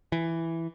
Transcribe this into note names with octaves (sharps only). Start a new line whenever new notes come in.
E3